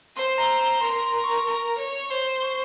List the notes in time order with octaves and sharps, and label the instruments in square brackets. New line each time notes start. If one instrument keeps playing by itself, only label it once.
[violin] C5 [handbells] C6
[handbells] A#5
A#5
[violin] A#4 [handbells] C6
[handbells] C6
C#6
[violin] A#4
C#5
[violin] C5 [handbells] C6
[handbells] C#6